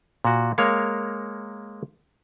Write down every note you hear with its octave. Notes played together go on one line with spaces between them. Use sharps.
A#2 F#4
G#3 A#3 A#4 C#5 F5